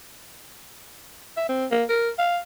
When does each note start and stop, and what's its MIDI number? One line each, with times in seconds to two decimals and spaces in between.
1.37 1.45 76
1.49 1.66 60
1.71 1.84 58
1.89 2.09 70
2.18 2.39 77